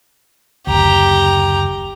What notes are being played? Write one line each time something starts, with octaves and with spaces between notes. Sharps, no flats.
F#1 D2 G4 A#5